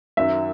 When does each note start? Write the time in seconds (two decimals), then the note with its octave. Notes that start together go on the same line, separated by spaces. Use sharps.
0.17 F#2 D#3 F#3 E5